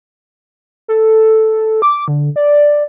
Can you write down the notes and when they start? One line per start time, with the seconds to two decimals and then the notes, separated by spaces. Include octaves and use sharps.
0.88 A4
1.82 D6
2.08 D3
2.36 D5